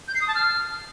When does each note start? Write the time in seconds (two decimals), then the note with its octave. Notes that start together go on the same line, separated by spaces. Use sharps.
0.08 G6
0.15 C7
0.21 D#6
0.28 A5
0.35 F6